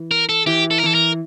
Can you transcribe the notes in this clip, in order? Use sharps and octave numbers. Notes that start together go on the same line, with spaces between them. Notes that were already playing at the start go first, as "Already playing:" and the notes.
Already playing: E3
A#4
A4
E3 G4
A4
A#4
E3 A4
A#4